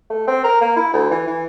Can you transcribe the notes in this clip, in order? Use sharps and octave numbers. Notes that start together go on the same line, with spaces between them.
A3
C4
A#4
A#3
E4
D2
E3
E3